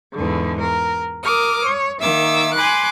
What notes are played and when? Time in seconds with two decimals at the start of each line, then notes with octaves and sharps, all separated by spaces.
0.14 E2 G#2 D3
0.60 A#4
1.24 A#4 D6 D#6 F6
1.65 C#5
2.00 D#3 A#3 E5 D6 E6
2.54 G#5 B5 C6 D6 F#6